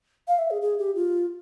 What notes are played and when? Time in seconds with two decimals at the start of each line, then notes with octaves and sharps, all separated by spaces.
0.28 F5
0.39 E5
0.51 G#4
0.62 G#4
0.78 G4
0.95 F4